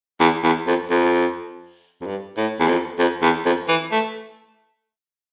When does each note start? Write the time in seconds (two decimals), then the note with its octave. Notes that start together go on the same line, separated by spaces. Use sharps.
0.20 E2
0.44 E2
0.67 F2
0.90 F2
2.01 F2
2.06 G2
2.37 A2
2.59 E2
2.68 F2
2.99 F2
3.22 E2
3.45 F2
3.68 E3
3.92 A3